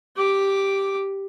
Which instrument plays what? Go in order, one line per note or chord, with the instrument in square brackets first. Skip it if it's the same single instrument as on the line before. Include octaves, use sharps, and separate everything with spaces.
[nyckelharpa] G4 D6